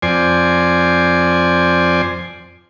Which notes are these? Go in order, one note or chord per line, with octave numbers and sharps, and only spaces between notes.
F2 C5 D5 G#5